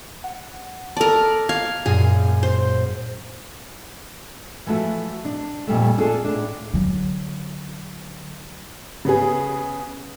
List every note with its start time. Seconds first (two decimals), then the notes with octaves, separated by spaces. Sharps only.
0.24 F#5
0.97 A4 A#4 D5 A5
1.49 F5 G#6
1.86 F#2 A#2 G#4
2.43 C5
4.66 E3 F3 A3 F#4
5.25 D4
5.67 F2 A#2 G3 A3
5.98 D4 F4 G#4 A4
6.25 A2 D4
6.74 D3 F#3
9.05 C#3 B3 G#4